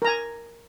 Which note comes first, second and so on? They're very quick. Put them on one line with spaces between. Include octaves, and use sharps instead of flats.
A#4 A#5 G#5